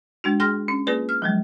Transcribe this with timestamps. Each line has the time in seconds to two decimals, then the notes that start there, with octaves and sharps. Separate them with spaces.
0.24 G#3 D4 F#4
0.40 G#4 G5 C6 F6 A#6
0.68 C#4
0.87 A#3 F4 G#4 B4 D5
1.09 F6
1.22 F3 F#3 G#3